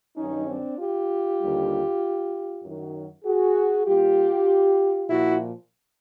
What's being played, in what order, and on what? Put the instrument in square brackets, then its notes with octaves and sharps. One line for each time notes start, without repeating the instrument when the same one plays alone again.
[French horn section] G2 D#3 F#3 C#4 D#4
C4 D4
F4 G4
D#2 D3 G3
F#2 D#3 F#3
F#4 G#4
A#2 G3 F4 G4
A#2 F3 E4 F#4